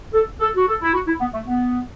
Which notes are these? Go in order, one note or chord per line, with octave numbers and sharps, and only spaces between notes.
A4
A4
F#4
A4
E4
F#4
E4
B3
A3
B3